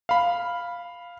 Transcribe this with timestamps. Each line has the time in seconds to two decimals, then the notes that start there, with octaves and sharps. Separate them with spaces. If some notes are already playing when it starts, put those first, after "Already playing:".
0.09 F5 B5